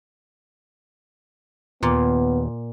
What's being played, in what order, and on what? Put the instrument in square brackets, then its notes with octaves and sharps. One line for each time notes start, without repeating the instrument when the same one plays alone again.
[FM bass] D#2 [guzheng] A#2 [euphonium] B3